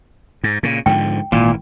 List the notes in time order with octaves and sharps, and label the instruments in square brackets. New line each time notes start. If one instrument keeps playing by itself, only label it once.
[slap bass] G#2
A#2 C#3
[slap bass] G#2 D3 F3 [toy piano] G5
[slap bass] G#1 E3 [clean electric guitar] A#2